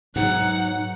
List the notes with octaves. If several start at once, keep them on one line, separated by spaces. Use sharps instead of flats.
G#2 B2 F#3 D#4 F#5